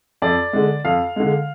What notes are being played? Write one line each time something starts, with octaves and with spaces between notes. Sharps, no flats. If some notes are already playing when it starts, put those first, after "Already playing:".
F2 D5
D3 G#3
F2 F5
D3 G#3